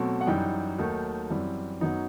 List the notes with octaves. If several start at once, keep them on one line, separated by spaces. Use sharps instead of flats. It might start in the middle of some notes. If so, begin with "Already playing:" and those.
Already playing: B2 F#3 A3 C4
F#5
F#2 E3 G3 D#4 G5
D#2 D#3 F#3 A3 D#4
F#2 E3 G3 C4
F#2 F#3 B3 D#4